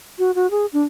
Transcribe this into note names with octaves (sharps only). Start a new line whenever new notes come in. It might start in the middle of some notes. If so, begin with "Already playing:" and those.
F#4
F#4
G#4
D4